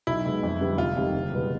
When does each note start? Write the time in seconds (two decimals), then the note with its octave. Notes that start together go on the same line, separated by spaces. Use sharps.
0.07 B1 E4
0.25 B2 G#3
0.43 F2
0.61 D3 G3 B3
0.78 F1 F4
0.96 F2 C3 D#3 G3
1.13 F#1
1.32 E2 B2 G3 B3